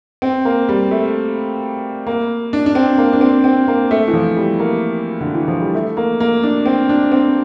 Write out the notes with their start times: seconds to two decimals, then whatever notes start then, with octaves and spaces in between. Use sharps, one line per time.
0.22 C4
0.45 A#3
0.69 G3
0.91 A3
2.07 A#3
2.53 D4
2.66 D4
2.75 C4
2.98 A#3
3.13 D4
3.21 C4
3.44 C4
3.68 A#3
3.91 A3
4.08 E3
4.13 F3
4.37 G3
4.59 A#3
5.21 D3
5.34 E3
5.48 F3
5.61 G3
5.74 A3
5.97 A#3
6.20 A#3
6.43 D4
6.66 C4
6.89 D4
7.12 C4